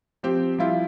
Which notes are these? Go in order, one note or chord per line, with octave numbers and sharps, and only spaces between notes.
F3 C4 G4
F3 G3 E4 F4 G4